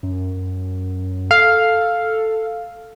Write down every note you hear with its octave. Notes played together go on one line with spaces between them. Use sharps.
F#2
A4 F5